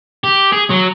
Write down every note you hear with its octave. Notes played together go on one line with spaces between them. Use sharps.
G4
G#4
F#3